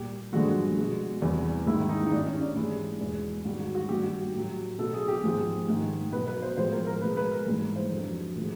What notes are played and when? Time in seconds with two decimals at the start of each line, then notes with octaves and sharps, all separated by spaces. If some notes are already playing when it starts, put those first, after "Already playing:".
Already playing: A#2 G3 G4
0.33 G2 D3 F3 G#3 F#4
0.77 B2 G#3
1.22 E2 C3 E3 G3
1.66 G#2 D#3 G3 E4
1.89 D#4
2.06 D#4
2.11 G2 D#3 G3 D4
2.26 C#4
2.41 D4
2.55 G#2 E3 G#3 E4
3.00 E2 B2 G#3
3.45 G#2 D#3 G3 F#4
3.60 F#4
3.75 F#4
3.89 G2 D#3 G3 G4
4.02 F#4
4.34 A2 F#3
4.79 B2 F#3 A4
4.94 G#4
5.08 G4
5.23 G#2 F3 G#3 G#4
5.68 G#2 D#3 G#3
6.12 B2 F#3 B4
6.27 B4
6.42 C5
6.57 A2 F3 G#3 C5
6.72 A#4
6.87 A#4
7.02 B2 G#3 B4
7.17 B4
7.32 A#4
7.46 G#2 E3 G3
7.76 C5
7.91 F2 D3 F#3
8.35 A2 F3 G#3